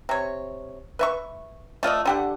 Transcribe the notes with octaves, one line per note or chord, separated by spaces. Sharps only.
C3 C#5
B4 E5 C#6
A3 F4 D5 D#5
D3 G4 F#5